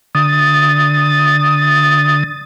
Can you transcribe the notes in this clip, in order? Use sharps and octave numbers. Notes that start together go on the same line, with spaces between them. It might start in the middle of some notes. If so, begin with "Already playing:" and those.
D3 D#6 A6